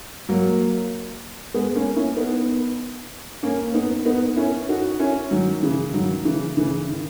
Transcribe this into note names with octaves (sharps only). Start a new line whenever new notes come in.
F#3 A#3
G#3 B3
A#3 C#4
C#4 E4
B3 D#4
A#3 C#4
B3 D#4
B3 D#4
C#4 E4
D#4 F#4
C#4 E4
D#3 F#3
C#3 E3
D#3 F#3
C#3 E3
C#3 E3
D#3